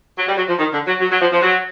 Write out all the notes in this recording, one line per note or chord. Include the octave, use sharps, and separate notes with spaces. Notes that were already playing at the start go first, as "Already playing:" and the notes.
F#3
G3
F#3
F3
D#3
D3
F#3
F#3
F#3
F3
F3
F#3